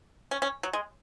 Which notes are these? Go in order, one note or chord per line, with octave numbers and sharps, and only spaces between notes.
C#4
C#4
F#3
G#3